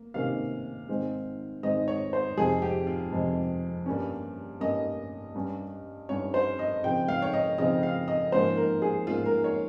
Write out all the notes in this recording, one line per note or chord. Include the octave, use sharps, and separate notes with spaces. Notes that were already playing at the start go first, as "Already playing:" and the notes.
Already playing: A#3
C3 D#3 A#3 C#4 F5
G#2 D#3 G#3 C4
G#2 D#3 G#3 C4 D#5
C#5
C5
F2 C3 F3 G#3 G#4
G4
F4
F2 C3 F3 G#3
G2 G3 A#3 C#4
G2 G3 A#3 C#4 D#5
G2 G3 C#4
G2 G3 C#4 C#5
C5
D#5
C#3 F3 C4 G5
F5
C#5
D#5
C#3 F3 C4 D#5
F5
D#5
G#2 F3 A#3 C#4 C5
A#4
G#4
G#2 F3 A#3 C#4 F4
A#4
C#5